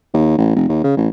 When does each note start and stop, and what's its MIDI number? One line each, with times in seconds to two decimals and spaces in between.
0.14 0.37 39
0.38 0.51 33
0.56 0.64 29
0.69 0.84 39
0.84 0.93 49
0.97 1.08 33